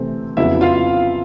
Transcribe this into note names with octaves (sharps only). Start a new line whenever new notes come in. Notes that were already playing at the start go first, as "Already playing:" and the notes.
Already playing: C3 E3 A3 C4
F2 C#3 F#3 B3 E4 E5
F4 F5